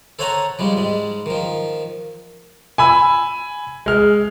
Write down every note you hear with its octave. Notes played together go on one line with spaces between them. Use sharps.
A4 C5 C#5 F#5 G#5 A#5
F3 G3 G#3
G#2 G#3
D#3 F3
G#5 B5 E6
G#3 F6